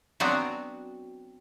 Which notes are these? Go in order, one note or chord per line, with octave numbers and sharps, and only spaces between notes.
F#3 B3 C4 D4 F#4